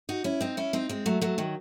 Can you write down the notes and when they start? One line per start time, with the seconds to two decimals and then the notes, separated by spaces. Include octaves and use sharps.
0.09 D#4 F#4
0.24 C#4 E4
0.41 C4 D#4
0.57 C#4 E4
0.73 C4 D#4
0.89 G#3 C4
1.06 F#3 A3
1.21 F#3 A3
1.38 D#3 F#3